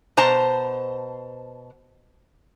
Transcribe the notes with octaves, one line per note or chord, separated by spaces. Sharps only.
B2 C5 A5 A#5